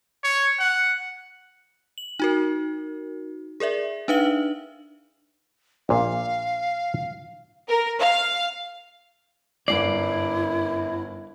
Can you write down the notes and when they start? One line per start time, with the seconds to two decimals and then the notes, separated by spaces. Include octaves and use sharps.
0.24 C#5
0.59 F#5
1.98 F#7
2.19 D#4 F#4 A#4
3.60 G#4 A#4 D5 E5
4.08 D4 D#4 B4 E5 F5 F#7
5.89 A#1 A#2 F5
7.67 A#4
8.00 F5
9.68 G1 F#2 E4 D5 C7